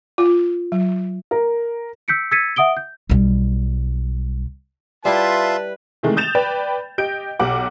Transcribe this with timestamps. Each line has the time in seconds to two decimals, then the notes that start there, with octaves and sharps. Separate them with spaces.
0.18 F4
0.72 F#3
1.31 A#4
2.08 E6 G6 B6 C#7 D7
2.31 E6 G#6 A6 B6 C#7 D#7
2.56 E5 F#5 D#6 D7 G7
2.77 G6
3.10 B1 G3
5.05 G3 E4 F4 B4 E5 A5 C6
6.03 C3 D#3 E3 G#3 A3
6.17 D#6 G6 A6 E7 F7
6.35 B4 D5 G5 B5
6.98 G4 D#5 G6 D7
7.40 B1 G4 F#5 D6